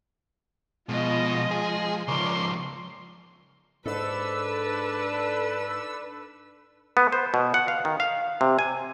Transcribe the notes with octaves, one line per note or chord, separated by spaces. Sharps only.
B2 F3 G#3 F4 D#5
G#4
C#2 F3 A#4 C#5 D5 C6
G#2 D4 A4 B4 E6
B3
C5
B2
F#5
F5
D#3
F5
C3
G#5